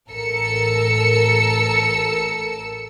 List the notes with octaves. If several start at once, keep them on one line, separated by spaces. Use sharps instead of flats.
A1 A4 A#4 E6 C#7